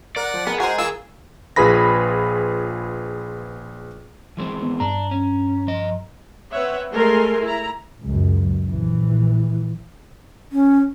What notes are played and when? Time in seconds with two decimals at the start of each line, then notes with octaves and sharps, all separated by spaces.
0.16 A#4 D5 F#5
0.34 F3
0.47 G#3 B3 A#4
0.60 F#4 G#4 A#4 C5
0.78 E3 F4 A#4 E6
1.56 A#1 F4 G#4 B4 B5 A#6
4.37 E3 G#3 C4
4.62 B3
4.80 G2 D4 A#5
5.11 C#4
5.67 F3 D#5
6.51 C4 B4 C#5 E5 F#5
6.92 G#3 A3 A4 A#4 G#5 C6
7.43 E4 A#5
8.01 C#2 F#2
8.68 A#1 E3
10.52 C#4